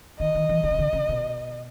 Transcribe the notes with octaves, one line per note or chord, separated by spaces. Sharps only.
D#3 D#5
D#3
E3
D#3
C#3
D3
C#3
B2